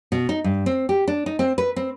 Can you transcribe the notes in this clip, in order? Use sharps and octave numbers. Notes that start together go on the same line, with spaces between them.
B2
D#4
G2
C4
G4
D4
D#4
C4
B4
C4